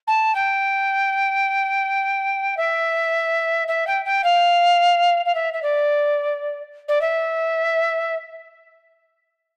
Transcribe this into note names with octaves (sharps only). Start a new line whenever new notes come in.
A5
G5
E5
E5
G5
G5
F5
F5
E5
E5
D5
D5
E5